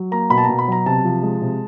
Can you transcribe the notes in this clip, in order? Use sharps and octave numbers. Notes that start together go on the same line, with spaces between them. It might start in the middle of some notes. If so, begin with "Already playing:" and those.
Already playing: F#3
A#3 A#5
B2 B5
A5
B2 A#5
B5
F#3 A#5
C3 A5
F3
G#3
C3